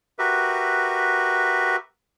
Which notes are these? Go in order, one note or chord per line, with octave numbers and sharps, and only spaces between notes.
F#4 G4 A#4 B4 E5